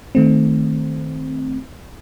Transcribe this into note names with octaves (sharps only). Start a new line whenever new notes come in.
D#3 A3 C4